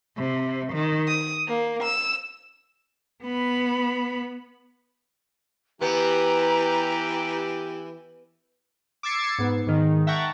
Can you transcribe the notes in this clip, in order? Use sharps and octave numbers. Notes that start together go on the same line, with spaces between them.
C3
D#3
D#6
A#3
E6
B3 B5
E3 B3 G4 A#5
D6 E6 G#6 A6 C7 C#7
G#2 B3
G#2 D#3
E5 F#5 G5 A5 A#5 C#6